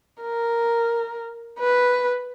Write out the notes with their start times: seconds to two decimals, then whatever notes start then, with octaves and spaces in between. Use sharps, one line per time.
0.22 A#4
1.59 B4